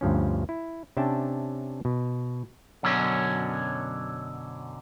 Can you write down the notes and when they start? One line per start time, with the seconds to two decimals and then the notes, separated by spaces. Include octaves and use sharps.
0.01 D2 G2 F3 C#4
0.49 E4
0.97 C3 C#4 D4 E5 G5 A5
1.85 B2
2.83 F#2 B2 D3 F#3 C#4